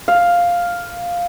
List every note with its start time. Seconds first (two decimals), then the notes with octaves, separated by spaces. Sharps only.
0.08 F5